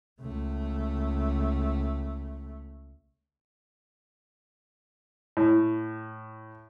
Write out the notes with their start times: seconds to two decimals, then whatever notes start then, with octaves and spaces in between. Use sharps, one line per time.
0.20 C#2 A3
5.37 A2